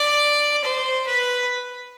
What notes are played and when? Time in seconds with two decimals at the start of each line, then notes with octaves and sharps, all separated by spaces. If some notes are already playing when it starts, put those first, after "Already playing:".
Already playing: D5
0.64 C5
1.07 B4